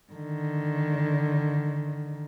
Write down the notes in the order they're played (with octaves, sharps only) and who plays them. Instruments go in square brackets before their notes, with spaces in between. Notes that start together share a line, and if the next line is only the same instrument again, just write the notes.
[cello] D3 D#3